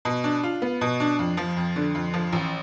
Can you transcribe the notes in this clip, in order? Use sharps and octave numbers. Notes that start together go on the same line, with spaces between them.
B2
D4
F4
B3
B2
D4
F2
F3
F2
D3
F2
F3
A1